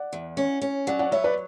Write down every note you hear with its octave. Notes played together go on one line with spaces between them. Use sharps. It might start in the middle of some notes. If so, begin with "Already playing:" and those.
Already playing: D5 F#5
E2
C#4
C#4
F#3 D5 F#5
D5 F#5
B3 C#5 E5
B4 D5